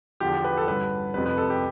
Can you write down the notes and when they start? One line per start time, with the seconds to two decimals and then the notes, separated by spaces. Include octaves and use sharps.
0.20 E2 D3 F3 G4
0.44 B4
0.57 A4
0.67 A1 G2 D3 B4
1.14 F1 F2 C3 F3 B4
1.26 B4
1.38 A4
1.50 G4